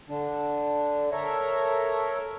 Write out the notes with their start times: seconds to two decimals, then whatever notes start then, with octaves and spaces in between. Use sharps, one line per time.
0.09 D3 D4
1.12 A4 A#4 C#5 E5 A#5